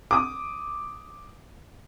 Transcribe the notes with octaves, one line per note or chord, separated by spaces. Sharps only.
D6 D#6